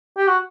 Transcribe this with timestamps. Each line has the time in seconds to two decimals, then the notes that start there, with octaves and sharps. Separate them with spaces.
0.17 G4
0.27 F#4